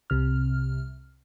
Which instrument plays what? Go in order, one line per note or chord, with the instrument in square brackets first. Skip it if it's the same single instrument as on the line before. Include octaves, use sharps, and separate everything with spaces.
[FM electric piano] C2 C3 F6